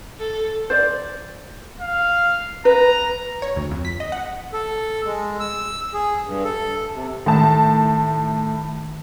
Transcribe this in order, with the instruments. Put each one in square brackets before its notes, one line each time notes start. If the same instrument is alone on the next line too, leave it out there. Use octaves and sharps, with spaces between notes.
[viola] A4
[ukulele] C5 D5
[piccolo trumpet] F5
[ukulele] B4 [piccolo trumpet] A#5
[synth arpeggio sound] C#5
D2
F2
B6
D#5
F#5
[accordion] A4
G#3
E6
G#4
G2
A4
C3
[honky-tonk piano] A2 A5 [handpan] D#3